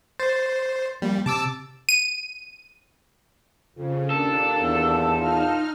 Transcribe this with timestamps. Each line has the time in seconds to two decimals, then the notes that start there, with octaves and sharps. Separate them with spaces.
0.20 C5 A6
1.02 F3 G3 A#3
1.26 C3 A5 D6 E6
1.89 D#7
3.75 F2 C#3
4.10 D#2 A#2 D4 A4
4.59 E2
5.16 A#2 D#4 F4 F6